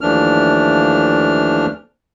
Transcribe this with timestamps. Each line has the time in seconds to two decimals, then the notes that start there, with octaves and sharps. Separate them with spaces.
0.01 D#2 E3 F3 A3 D4 F6